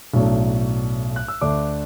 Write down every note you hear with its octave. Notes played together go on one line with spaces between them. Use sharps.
B1 A2 F#3 A3 D4
F#6
E6
D2 D3 A3 D4 D6